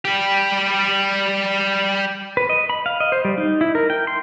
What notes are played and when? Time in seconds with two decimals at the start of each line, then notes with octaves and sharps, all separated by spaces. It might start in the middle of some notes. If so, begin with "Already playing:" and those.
0.05 G3 G4
2.37 B4
2.49 D#5
2.70 B5
2.86 F5
3.00 D#5
3.12 C5
3.25 G3
3.38 D#4
3.61 E4
3.75 A#4
3.90 G5
4.07 C6